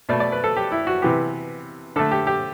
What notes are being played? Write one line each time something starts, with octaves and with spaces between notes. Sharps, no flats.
B2 A3 D5
D5
B4
A4
G4
E4
F#4
C3 E3 B3 G4
D3 A3 A4
G4
G4